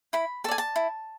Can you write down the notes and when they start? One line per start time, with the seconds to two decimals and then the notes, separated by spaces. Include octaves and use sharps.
0.13 E4 B5
0.44 A4 A5
0.48 D5 G#5
0.58 A5
0.76 E4